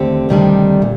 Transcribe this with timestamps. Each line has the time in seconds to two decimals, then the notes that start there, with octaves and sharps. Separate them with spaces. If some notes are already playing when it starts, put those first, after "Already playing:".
Already playing: D#2 D3 A3 C4 G4
0.29 D2 C3 D#3 G3 D4
0.82 A#2